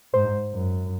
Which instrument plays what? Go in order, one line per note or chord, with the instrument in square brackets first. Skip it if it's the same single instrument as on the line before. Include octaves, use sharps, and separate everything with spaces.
[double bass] G#2 [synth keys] C5
[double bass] F#2